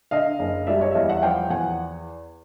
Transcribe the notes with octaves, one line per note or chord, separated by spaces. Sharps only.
D3 D#5 F5
F#1
G3 D5 E5
C#5 D#5
E5
E2 D#5 F5
E5 F#5
F3 F5 G5
E2 F#5 G#5